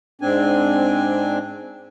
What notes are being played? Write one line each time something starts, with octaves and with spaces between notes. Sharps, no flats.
G#2 C4 D4 G#5